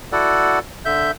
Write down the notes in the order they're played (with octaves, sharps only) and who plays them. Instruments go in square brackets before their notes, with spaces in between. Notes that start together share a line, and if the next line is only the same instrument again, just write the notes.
[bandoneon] E4 F#4 A4 D5 F#5
D3 E5 G6